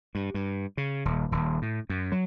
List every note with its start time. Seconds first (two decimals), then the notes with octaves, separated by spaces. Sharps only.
0.15 G2
0.34 G2
0.77 C#3
1.05 D#1
1.32 D#1
1.62 A2
1.90 F#2
2.12 F#3